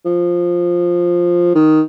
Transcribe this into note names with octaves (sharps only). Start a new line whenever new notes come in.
F3
D#3